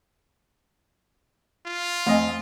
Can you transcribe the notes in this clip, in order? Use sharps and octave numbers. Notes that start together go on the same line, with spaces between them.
F4
F2 A3 D#5 G#5